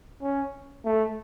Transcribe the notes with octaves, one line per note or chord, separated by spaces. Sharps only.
C#4
A3